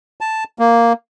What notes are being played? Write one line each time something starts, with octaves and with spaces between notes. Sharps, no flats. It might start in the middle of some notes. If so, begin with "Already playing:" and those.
A5
A#3